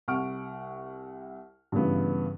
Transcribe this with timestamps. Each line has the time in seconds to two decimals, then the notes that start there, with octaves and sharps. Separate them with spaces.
0.08 C2 F#5 C#6 F6 D7
1.72 G2 C#3 E3 B3